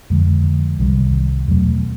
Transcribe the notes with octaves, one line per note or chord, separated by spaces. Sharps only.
F2 D3 F3 G#3
C2 C3 D#3 G3
E2 B2 F#3 A3